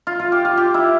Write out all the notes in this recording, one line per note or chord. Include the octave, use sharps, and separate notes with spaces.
F4
F4
G4
F4
G4
E4